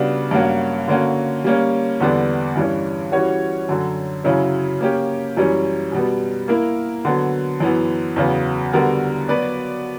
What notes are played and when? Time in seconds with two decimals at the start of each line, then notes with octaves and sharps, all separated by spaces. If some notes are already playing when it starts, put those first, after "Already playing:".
Already playing: C#3 G3 B3 D4 F#4
0.31 G2 F#3 A#3 C#4 F#4
0.88 D3 A#3 C#4 F#4
1.44 G3 A#3 C#4
2.00 E2 D3 G3 B3 D4
2.56 G2 E3 G3 C#4
3.12 E3 G3 C#4 F#4 C#5
3.69 F#2 D3 F#3
4.24 F#2 C#3 F#3 C#4 E4
4.81 A#3 C#4 G4
5.36 F#2 E3 G3 C#4
5.92 B2 G3 B3
6.48 A#3 E4 A#4
7.05 D3 F#3 B3
7.60 F#2 E3 B3
8.16 E2 C#3 F#3 B3
8.73 D3 G3 B3 F#4 A#4
9.28 F#3 B3 F#4 B4 D5